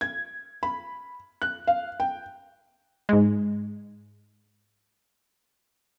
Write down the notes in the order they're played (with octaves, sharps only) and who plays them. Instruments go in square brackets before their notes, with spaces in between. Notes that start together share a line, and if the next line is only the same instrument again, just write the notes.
[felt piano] G#6
B5
F#6
F5
G5
[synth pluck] G#2 G#3